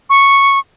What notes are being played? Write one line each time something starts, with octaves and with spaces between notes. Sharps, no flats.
C#6